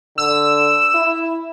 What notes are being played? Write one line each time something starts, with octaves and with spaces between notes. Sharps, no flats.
D3 E6
E4